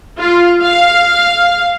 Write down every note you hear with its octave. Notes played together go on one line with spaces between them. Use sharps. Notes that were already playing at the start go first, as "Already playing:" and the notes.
F4
F5